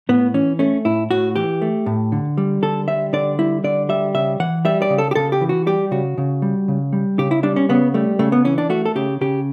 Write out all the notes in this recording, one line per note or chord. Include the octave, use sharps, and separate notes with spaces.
A2 B3
E3 C#4
A3 C#4
A2 E4
A2 F#4
E3 G4
A3
A2
D3
G3
D3 A4
G3 E5
D3 D5
G3 E4
D3 D5
G3 E5
C#3 E5
E3 F#5
G3 E5
D5
C#3
A4
G4
C#3 A4
G4
E3
F#4
G3 G4
C#3 F#4
C#3
G3
C#3
G3
C#3 G4
E4
G3 D4
C#4
C#3 B3
G3 A3
C#3 A3
B3
E3 C#4
D4
A3 F#4
A4
C#3 G4
C#3 G4